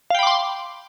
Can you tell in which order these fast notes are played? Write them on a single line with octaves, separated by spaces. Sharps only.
F5 G5 B5 D6 C6